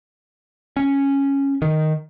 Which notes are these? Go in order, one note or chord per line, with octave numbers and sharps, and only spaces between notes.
C#4
D#3